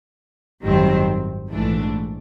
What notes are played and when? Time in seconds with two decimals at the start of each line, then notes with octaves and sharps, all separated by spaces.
0.63 G#1 F#2 D#3 G3 C4
1.51 A#1 G#2 E3 A3 D4